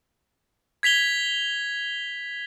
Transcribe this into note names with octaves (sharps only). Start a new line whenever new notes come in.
G#6 B6 F7 G7